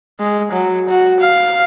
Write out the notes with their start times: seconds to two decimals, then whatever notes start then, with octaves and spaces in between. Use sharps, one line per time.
0.20 G#3
0.52 F#3
0.89 F#4
1.20 F5